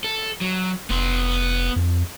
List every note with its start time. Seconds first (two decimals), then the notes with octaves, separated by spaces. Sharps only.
0.04 A4
0.41 F#3
0.90 F1 B3 C6
1.76 F2